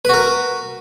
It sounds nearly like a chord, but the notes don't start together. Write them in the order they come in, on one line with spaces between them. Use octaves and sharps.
B4 F#4 A#4